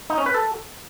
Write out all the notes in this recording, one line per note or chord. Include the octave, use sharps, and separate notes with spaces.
D#4
C#4
B4
A4